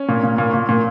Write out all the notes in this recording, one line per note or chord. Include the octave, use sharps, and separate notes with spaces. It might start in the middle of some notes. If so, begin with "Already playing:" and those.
Already playing: C#4
A#2
A#2
A#2
A#2
A#2